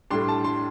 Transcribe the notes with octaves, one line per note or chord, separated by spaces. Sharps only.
A2 G3 D4 C6
A5
C6